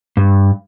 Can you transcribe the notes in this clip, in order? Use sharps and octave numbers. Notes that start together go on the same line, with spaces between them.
G2